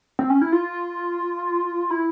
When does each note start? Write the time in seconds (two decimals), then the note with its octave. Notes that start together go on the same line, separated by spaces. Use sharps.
0.19 C4
0.30 C#4
0.42 E4
0.52 F4
1.91 E4